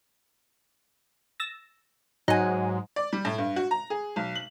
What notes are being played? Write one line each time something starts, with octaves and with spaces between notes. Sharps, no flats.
E6 A6 A#6
G#2 F#3 D#4 F#5 G#5
D5
G3
A2
G2
F#4
A#5
G#4
B1
F#7